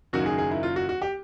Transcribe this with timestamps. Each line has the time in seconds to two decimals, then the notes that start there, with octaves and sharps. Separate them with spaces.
0.13 F#1 F#2 D#3 F#3 F#4
0.26 G#4
0.38 G#4
0.51 E4
0.63 F4
0.76 F#4
0.89 F#4
1.02 G4